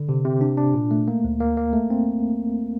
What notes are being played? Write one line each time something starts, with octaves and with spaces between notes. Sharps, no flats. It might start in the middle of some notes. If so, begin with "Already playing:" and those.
Already playing: D3
C3
C3
D4
D4
A#2
A3
A#3
D2
A#3
A#3
A3
C4